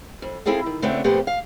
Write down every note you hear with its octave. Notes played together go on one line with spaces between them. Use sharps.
F2
C4 E4 G#4 A4 F5
D#3
C#3 A3 B3 C4 D4
F2 A#2 A3 B3 G4 C5
F5